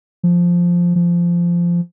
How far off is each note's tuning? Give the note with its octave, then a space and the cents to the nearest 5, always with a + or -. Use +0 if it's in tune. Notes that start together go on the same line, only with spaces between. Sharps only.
F3 +0
F3 -15